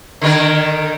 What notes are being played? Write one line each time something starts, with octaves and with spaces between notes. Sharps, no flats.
D3 D#3 A#4